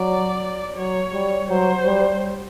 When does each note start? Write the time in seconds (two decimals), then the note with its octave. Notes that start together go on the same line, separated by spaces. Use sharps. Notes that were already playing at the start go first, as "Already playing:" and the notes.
Already playing: F#3 D5
0.77 F#3 C#5
1.13 G3
1.49 F#3 C5
1.86 G3